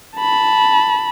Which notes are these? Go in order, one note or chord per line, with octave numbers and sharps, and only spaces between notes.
A5 B5